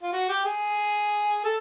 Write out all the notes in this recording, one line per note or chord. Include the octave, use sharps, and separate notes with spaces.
F4
F#4
G4
G#4
A4